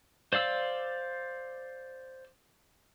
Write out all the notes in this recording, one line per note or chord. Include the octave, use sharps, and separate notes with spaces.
C5 D5 F5 E6